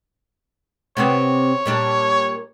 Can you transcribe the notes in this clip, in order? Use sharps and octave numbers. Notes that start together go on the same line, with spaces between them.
C3 B3 C4 C#5
A#2 G3 D4